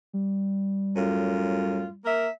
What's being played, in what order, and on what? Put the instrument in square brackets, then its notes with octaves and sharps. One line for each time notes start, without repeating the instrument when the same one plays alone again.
[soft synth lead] G3
[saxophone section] F#2 A2 F4
A#3 A#4 E5